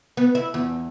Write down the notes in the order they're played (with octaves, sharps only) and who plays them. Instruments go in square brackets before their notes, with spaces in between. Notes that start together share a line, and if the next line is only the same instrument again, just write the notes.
[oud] B3
E4
E2